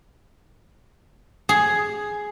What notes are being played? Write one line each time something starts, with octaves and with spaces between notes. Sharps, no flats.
G#4